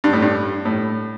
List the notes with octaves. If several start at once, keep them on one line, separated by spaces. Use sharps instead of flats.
G2
A2
G2
A2